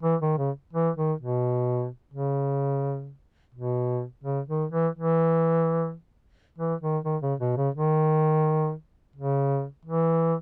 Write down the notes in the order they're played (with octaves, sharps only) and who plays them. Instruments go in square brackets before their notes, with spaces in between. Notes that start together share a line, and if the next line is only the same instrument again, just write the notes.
[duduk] E3
D#3
C#3
E3
D#3
B2
C#3
B2
C#3
D#3
E3
E3
E3
D#3
D#3
C#3
B2
C#3
D#3
C#3
E3